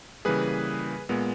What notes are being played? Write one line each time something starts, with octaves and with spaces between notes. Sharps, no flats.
C#3 E3 G3 A#3 G#4 B4
A#2 G#3 B3